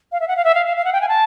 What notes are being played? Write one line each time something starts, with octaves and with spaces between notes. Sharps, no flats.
F5
E5
F#5
F5
E5
F5
F5
F5
F#5
G5
G#5
A5